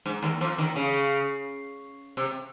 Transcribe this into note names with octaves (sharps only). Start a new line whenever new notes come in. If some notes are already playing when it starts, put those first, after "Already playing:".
G#2
D#2 D#3
F2 F3
D#2 D#3
C#3
C3